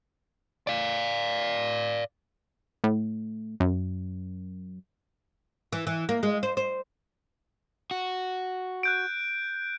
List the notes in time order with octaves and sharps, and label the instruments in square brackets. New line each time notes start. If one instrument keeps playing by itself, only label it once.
[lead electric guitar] D5 F5
[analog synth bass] A2
F#2
[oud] E3
E3
A#3
G#3
C5
C5
[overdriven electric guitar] F#4
[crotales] F#6 G6 D7